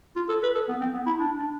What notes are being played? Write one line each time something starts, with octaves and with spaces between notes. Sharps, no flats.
F4
A4
B4
A4
B3
C4
B3
E4
D4
D4